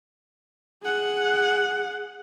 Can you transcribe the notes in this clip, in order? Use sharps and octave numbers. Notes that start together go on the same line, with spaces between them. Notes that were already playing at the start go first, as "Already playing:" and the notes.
G#4 F#5